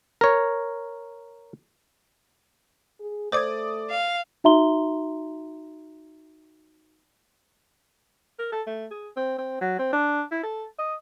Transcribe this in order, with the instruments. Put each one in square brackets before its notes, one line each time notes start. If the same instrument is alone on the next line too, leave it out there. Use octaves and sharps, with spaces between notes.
[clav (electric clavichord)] A#4 C#5
[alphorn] G#4
[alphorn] A3 [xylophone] C5 D6 G#6 [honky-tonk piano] D5 D#6
[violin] F5
[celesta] D#4 F#4 E5 A#5 C6 G7
[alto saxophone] A#4
A4
A3
G#4
C4
C4
F#3
C4
D4
E4
A4
D#5